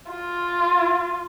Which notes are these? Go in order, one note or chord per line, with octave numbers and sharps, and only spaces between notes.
F4